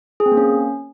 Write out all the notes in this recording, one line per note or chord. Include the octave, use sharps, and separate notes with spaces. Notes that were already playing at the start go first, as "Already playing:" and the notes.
G#4
C4
A#3
C#4